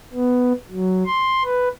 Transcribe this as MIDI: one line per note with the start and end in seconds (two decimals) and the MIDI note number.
0.13 0.53 59
0.71 1.04 54
1.06 1.43 84
1.44 1.69 71